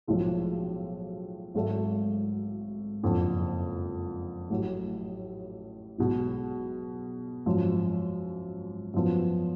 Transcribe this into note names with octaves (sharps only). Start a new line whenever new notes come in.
B1 A2 F3 G#3
G#1 G#2 F#3 A3
F#1 F2 D3
A1 A2 F#3
B1 B2 G#3
G#1 F#2 F3
F#2 F3 B3